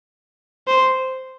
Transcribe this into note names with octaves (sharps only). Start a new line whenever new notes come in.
C5